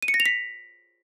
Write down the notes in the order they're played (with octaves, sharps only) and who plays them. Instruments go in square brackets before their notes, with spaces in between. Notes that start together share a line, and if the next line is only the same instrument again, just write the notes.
[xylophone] D#7
C#7
A#6
F7
B6